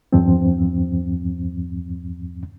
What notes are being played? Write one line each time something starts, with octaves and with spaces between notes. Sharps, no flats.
E2 G2 F3 C4